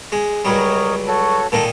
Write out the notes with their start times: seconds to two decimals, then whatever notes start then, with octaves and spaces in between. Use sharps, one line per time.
0.12 G#3
0.45 C#2 F#3 G3 A#4 C#5 D#5
1.07 F#4 A4 C#5
1.52 A#2 D#3 D#4 A4